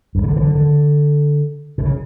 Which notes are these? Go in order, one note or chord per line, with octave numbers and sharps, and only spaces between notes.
G2
C#3
D3
E3
D3
D3
B2
C#3